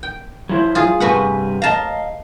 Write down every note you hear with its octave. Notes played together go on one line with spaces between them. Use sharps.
G5
F#3 E4 C5
F4 G#4
G2 C3 F#4 B4 F#5 G#5
D#5 F5 A5 A#5